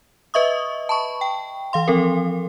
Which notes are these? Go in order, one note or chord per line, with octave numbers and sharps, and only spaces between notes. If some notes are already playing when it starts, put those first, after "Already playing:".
B4 D#5 E5 C#6 D#6
A5 B5 C#6
G5
E3 F5 C6
F3 C4 A4 A#4